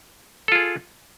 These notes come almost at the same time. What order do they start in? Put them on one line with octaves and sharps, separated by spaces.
A4 F4 G#4